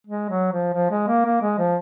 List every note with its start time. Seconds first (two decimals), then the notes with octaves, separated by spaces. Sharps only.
0.07 G#3
0.30 F#3
0.52 F3
0.74 F3
0.91 G#3
1.08 A#3
1.25 A#3
1.42 G#3
1.58 F3